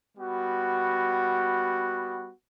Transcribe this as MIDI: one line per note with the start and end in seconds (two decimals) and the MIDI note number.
0.18 2.32 55
0.18 2.32 59
0.18 2.32 66